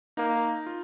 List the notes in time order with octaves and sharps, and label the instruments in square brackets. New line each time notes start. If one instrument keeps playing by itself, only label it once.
[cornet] A#3 [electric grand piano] D#4
[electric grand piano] F4